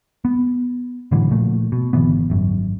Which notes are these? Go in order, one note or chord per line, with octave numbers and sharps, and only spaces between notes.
B3
A2 D3 E3 F#3
A#2 F3 A3
B2
G#1 D3 E3 B3
G#1 F#2